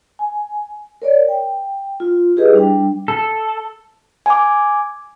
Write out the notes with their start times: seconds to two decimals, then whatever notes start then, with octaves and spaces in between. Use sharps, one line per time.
0.19 G#5
1.02 A#4 C#5 D5
1.28 G5
2.00 F4
2.36 E4 G4 G#4 B4 D#5
2.53 G3 D4 G5
3.08 A4
4.26 G#5 D6